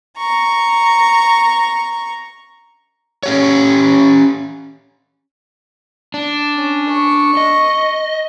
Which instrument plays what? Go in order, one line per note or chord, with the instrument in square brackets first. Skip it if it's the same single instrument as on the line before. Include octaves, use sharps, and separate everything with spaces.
[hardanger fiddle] A#5 C#6
[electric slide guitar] C#4 G4 C#5
D4
[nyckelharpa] C#4
C#6
[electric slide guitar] D#5